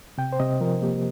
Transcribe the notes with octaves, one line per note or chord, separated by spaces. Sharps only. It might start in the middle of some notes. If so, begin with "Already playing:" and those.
C3 G5
C5
C3 D#5
F3 A#4
A#3 G4